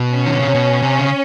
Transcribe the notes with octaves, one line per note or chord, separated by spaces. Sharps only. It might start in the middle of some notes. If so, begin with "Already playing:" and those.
Already playing: B2
C#4
D#3
D3
C#3
C3
B2
C3
C#3